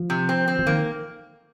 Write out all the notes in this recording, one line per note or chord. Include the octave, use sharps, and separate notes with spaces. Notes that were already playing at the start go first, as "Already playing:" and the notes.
Already playing: F3
C3
C4
C4
F3
D#3 A#3